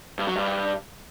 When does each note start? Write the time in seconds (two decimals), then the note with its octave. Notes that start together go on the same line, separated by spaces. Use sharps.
0.19 G2
0.27 F#3
0.36 G2